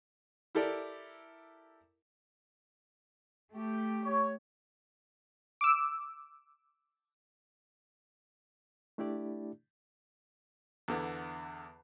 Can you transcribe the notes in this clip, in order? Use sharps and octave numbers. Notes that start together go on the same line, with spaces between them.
E4 G4 A4 A#4 D5
A3 G4
C#5
D6 E6
A3 D4 E4 G4 D5
E2 D3 B3